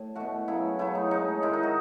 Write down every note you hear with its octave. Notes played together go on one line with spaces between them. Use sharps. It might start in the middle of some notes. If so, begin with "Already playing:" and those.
Already playing: A2
B2 A3 F#4
C#3 F#3 A3 E4
C#3 F#3 A3 E4
D#4
A2 G#3 D#4
G#2 D#3 G#3 E4
D#4
F#4